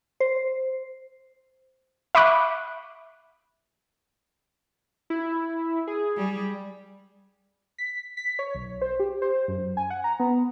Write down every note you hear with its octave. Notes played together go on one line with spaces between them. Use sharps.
C5
E5 B5 C#6 D6 F#6
E4
G#4
G3
B6
B6
C#5
B1
C5
G4
C5
F#2
G#5
F#5
A#5
B3